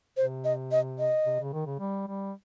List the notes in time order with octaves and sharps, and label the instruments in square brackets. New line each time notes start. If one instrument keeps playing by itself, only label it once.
[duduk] C3 [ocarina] C5
[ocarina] D#5
D#5
D#5
[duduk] C3
C#3
D#3
C#3
G3
G3